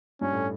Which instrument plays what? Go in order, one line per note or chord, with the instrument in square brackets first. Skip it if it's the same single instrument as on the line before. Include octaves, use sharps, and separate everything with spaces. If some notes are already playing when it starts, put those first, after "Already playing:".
[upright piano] G2 [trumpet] C#4
[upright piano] A2